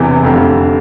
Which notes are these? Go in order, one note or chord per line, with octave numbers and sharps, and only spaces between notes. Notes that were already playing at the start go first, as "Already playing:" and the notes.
Already playing: E1 E2 C3 E3
F1 F2 D3 G4